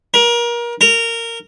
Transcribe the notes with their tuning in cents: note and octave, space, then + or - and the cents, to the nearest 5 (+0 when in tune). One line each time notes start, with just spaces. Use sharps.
A#4 +30
A#4 -15